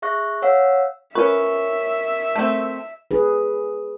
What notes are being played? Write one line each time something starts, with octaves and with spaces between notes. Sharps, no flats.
G#4 E5 C#6 F#6 A#6
C#5 F5 F#5 E6
C#4 F4 A#4 B4 E5 C#6
A3 C4
G#4 B4